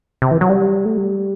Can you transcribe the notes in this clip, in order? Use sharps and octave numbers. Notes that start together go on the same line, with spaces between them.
C3
E3
F#3
G3
A3
G3